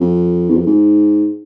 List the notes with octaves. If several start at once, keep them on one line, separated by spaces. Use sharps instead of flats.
F2
E2
F2
G#2